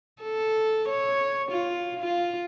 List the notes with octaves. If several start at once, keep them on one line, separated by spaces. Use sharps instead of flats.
A4
C#5
F4
F4